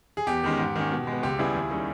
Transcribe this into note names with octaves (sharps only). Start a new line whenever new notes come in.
G#4
E2 G4
D#3 G#3 C#4
G#2
D#3 A#3 C#4
B2
G#3 B3
C#2 G4
C#3 G3 B3 E4 G#4
D#2
D#3 G3 C#4